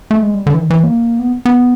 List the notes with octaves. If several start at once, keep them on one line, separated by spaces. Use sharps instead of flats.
A3
G#3
G3
D3
E3
D#3
E3
A#3
B3
B3